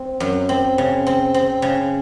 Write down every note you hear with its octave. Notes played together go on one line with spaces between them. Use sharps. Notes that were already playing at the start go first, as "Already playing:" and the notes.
Already playing: C4
F#2
C4
C#3
C4
C4
C#3